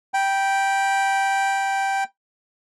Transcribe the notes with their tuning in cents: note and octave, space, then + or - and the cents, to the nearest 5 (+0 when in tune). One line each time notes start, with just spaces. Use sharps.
G5 +0 B5 -30